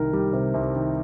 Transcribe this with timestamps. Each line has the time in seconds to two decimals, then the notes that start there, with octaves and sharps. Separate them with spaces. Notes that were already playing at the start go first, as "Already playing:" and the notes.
Already playing: C2 D#3 A#4
0.13 G3
0.33 C3
0.54 C2
0.76 D#3